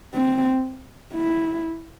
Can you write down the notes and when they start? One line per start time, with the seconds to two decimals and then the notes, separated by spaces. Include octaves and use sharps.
0.15 C4
1.14 E4